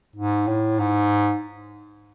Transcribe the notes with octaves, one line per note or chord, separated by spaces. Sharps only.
G#2
A2
G#2